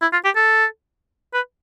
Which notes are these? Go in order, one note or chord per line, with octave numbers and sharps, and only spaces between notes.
E4
F4
G4
A4
B4